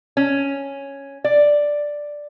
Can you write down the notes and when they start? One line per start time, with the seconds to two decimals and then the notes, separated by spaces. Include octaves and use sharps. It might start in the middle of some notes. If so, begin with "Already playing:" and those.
0.17 C#4
1.24 D5